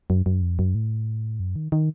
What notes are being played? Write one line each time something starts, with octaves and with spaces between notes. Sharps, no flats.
F#2
F#2
F2
F#2
A2
F#2
D#3
D#3